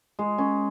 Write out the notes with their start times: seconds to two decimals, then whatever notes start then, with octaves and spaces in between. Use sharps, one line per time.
0.19 G#3
0.38 C#4